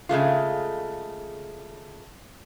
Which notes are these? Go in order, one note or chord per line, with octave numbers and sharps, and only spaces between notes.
C#3 G#3 A3 F4